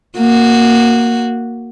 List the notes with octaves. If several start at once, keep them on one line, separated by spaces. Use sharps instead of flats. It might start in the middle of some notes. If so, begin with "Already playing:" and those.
A#3 F#4